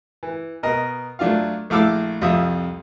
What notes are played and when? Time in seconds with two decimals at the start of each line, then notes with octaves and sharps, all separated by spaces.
0.23 E3
0.63 B2 A#4 D#5
1.19 F#3 A3 D4 F4 F5
1.70 A#1 A3 E4 F5 D6 E6
2.21 C2 F2 F4 E5 D#6